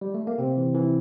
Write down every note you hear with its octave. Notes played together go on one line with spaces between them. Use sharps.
G3
A3
A#3
C3 C4
E3
E3